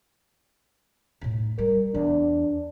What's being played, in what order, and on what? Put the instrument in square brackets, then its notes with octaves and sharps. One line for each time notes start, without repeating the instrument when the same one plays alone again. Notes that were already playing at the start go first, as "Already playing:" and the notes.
[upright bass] A2 D#4
[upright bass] G3 [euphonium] A#4
[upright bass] E2 [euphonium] D4